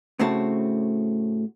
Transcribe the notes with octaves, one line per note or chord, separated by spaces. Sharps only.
A2 C#3 A3 C4 F#4 A5